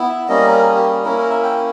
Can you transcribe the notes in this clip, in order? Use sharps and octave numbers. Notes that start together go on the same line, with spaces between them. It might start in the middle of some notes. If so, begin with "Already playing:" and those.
Already playing: B3 E4
E5
G3 A#3 C#4 D#5
A#4
G#4
G4
G#4
A#3 C#4 E4 A#4
A#4
E5
G5